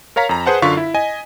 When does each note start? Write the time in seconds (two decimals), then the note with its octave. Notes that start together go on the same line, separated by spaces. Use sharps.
0.16 A#4 C#5 F5 A#5 B6
0.29 F2 A#5
0.46 G#4 B4 C5 F#5 A5
0.62 F#2 D3 F4 F5 C#6 B6
0.77 E4
0.94 D#5 G#5